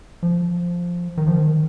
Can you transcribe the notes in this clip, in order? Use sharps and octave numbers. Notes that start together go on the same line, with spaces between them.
F3
D#3
F3
D#3